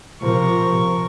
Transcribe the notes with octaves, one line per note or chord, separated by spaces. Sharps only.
C3 F3 A#4 C#6